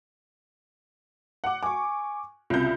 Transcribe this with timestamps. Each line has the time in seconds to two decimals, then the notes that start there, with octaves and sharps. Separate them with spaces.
1.44 F#5 D6
1.63 G#5 C#6 D6
2.50 C2 C#3 F4 G6